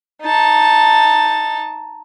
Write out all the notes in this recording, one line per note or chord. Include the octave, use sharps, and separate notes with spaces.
D#4 A5